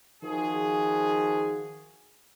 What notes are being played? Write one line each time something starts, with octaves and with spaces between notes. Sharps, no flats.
D#3 F3 F#4 G#4